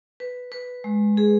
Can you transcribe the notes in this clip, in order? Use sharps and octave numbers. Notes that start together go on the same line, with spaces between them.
B4
B4
G#3
G#4